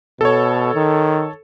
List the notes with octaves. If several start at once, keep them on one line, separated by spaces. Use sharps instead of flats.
B2 A4 C#5
D#3